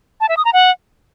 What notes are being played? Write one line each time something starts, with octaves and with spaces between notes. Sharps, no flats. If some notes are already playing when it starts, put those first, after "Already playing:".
A5
E5
D#6
A#5
F#5